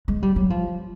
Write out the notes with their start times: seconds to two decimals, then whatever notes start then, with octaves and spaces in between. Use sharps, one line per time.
0.08 G#3
0.23 G3
0.36 F#3
0.50 F3